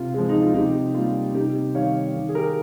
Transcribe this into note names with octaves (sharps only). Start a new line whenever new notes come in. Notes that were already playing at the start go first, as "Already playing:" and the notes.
Already playing: C3 F4
F3 G#3
D#4
F4
C3 D#4 G4
G3 A#3 F4
C3 D#4 G4
D#3 G3 C#5 F5
D#3
G#4
G4 A#4